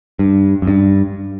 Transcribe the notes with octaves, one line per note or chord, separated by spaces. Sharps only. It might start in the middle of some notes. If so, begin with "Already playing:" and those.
G2
F#2
G2